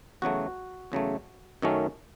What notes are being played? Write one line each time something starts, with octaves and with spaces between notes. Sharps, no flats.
E2 C#3 F#3 A3 F#4
E2 C#3 F#3 A3
F#2 D#3 F#3 A3 C#4